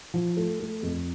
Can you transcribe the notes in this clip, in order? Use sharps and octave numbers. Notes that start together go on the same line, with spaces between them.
F3
A3
A3
F2